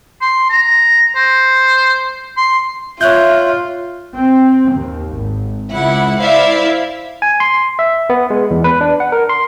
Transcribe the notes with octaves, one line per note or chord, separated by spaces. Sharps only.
C6
A#5
C5
C6
F4 C#5 E5 F#6 G6
C4
D#2
G#1
C#2 E4 F#5
E4 C5 D5 E5 F5
G#5
C6
E5
B3
G#3
E2
B4
D4
F#5
A#4
C6